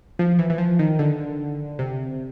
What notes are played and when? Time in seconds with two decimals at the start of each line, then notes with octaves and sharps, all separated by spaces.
0.19 F3
0.39 E3
0.50 E3
0.58 F3
0.79 D#3
0.99 D3
1.79 C3